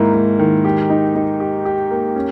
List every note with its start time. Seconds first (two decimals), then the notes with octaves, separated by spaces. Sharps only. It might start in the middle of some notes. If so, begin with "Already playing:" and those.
Already playing: G#2 D#3 A#3 E4
0.14 G#2
0.39 D#3
0.65 G4
0.90 D#4
1.15 D#4
1.40 G4
1.65 G4
1.91 A#3
2.16 C#4